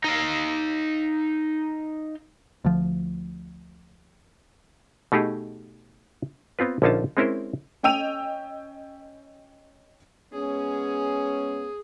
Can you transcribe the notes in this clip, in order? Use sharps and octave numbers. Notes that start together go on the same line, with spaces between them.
D#4 F5
D2 F3
B2 A3 D#4 G4 G#4
B3 C4 F4 B4
A#1 D3 C#4 D#4 F4 A5
G#3 C4 C#4 E4 A#4 C5
C#4 D#5 G5 E6 D#7 F7
G#3 B3 C#4 G#4